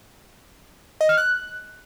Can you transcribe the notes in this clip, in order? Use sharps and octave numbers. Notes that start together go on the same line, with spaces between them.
D#5
F6
F#6